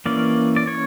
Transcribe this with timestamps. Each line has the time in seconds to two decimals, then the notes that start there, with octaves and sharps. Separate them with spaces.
0.06 E3 A#3 C#4 D5
0.56 D5
0.67 C#5